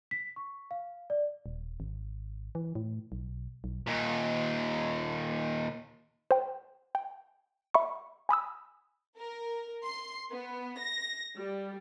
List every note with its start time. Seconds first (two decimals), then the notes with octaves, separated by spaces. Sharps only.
0.11 B6
0.36 C#6
0.71 F5
1.10 D5
1.46 D#1
1.80 G#1
2.55 E3
2.75 A2
3.12 B1
3.64 B1
3.87 D#2 A#2
6.31 C5 G5
6.95 G5
7.74 E5 B5 C#6
8.29 G#5 B5 D#6 E6
9.17 A#4
9.84 C6
10.32 B3
10.79 A#6
11.36 G3